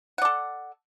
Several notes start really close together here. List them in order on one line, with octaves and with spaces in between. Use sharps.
F#5 D5 A4